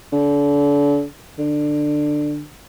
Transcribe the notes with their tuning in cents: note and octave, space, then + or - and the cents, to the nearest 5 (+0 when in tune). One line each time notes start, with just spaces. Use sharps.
D3 -35
D3 +15